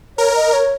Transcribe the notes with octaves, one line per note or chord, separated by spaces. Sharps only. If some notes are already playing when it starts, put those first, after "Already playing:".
A#4 C#5
D#5
C#5